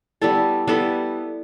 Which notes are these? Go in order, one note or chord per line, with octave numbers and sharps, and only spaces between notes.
G3 B3 E4 A4
G3 B3 E4 A4